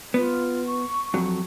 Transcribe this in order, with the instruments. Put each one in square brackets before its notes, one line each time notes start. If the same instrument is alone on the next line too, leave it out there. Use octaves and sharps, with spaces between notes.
[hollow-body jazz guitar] B3 [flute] F4
[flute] C#6
[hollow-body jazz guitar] F2 F#3